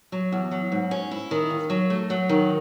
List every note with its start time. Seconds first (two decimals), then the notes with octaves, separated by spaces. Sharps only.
0.12 F#3
0.32 E2
0.51 F#3
0.72 G#2
0.91 C#4
1.11 E4
1.31 D#3
1.50 D#2
1.70 F#3
1.90 A3
2.10 F#3
2.29 D#3